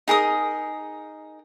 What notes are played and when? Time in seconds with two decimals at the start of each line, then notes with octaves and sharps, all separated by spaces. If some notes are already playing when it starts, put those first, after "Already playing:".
0.08 D#4 G#4 A#4 D#6